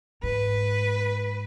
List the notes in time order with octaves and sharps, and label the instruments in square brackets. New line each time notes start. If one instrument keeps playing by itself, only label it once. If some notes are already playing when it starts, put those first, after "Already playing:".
[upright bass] G#2 [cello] B4